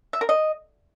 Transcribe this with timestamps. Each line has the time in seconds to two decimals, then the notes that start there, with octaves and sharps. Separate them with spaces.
0.13 E5
0.21 A#4
0.29 D#5